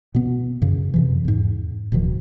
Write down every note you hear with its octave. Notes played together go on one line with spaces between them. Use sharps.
B2 B3
F#2 C#3
F2 C3 E3
E2 G#2
D1 B2 D#3 F3